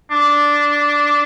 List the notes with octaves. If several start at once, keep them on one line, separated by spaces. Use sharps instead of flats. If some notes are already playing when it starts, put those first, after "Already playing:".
D4